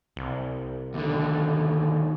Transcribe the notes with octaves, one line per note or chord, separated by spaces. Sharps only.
C2
D#2 D3